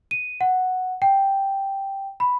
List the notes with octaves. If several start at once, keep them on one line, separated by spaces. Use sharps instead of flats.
D#7
F#5
G5
B5